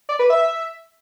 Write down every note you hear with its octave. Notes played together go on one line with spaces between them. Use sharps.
D5
B4
E5